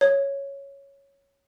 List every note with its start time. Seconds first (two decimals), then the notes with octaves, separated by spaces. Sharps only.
0.01 C#5